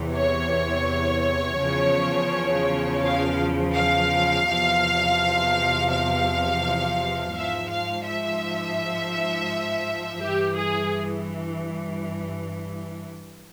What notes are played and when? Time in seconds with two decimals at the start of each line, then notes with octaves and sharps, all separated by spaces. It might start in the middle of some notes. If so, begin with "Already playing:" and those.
Already playing: E2 C3 E3
0.15 C#5
1.59 E2 C#3 F3
3.02 F5
3.75 F5
4.46 E2 C3 F3
5.90 F5
7.34 G#2 F3 E5
7.70 F5
8.06 E5
10.21 G2 E3 G4
10.58 G#4